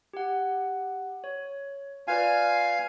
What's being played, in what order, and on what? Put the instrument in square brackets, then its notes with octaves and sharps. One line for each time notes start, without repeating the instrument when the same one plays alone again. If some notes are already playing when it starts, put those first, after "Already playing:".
[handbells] G4 F#5
C#5
[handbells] F4 B4 D5 [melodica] F5 G#5